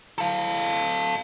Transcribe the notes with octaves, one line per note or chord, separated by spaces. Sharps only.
A4 F5